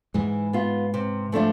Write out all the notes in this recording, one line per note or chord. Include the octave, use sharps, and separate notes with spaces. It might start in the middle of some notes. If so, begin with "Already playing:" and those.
G#2 E3 G#3
B3 F4
C3
F3 A3 D4 F4